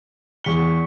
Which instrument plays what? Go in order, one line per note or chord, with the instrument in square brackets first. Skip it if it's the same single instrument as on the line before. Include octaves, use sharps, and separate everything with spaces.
[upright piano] E2 G7 [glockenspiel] C#6 B6 C#7